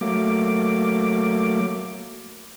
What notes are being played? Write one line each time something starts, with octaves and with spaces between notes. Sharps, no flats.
F#3 A3 A#3 D6